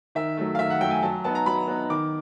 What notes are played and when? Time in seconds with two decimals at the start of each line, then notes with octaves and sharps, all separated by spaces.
0.15 D#3 E5
0.37 F#3 A3
0.55 F5
0.59 D#3 E5
0.70 F#5
0.81 F#3 A3 G5
0.91 G#5
1.03 F#3 A5
1.24 B3 D#4 A5
1.35 A#5
1.46 F#3 B5
1.68 B3 D#4
1.90 D#3 D6